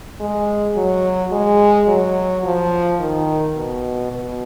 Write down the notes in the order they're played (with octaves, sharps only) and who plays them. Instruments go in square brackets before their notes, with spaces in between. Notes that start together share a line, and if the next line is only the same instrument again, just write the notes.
[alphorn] G#3
F#3
G#3
F#3
F3
D#3
B2
B2